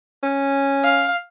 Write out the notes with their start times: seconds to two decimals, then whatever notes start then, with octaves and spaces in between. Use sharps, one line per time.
0.23 C#4
0.84 F5